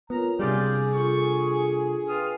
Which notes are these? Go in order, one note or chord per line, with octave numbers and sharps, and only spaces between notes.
B3 F4 A#4 C#5 A#5
C3 G3 D4 F4 G4 G#4 D5
D4 F4 A4 C#6
F4 B4 G5 G#5 D#6 F6